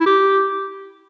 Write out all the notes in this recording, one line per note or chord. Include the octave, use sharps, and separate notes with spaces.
E4
G4